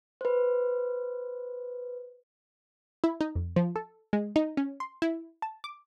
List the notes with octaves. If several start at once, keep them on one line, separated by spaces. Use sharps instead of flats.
B4 C5
E4
D#4
F2
F3
A4
G#3
D#4
C#4
C6
E4
A5
D6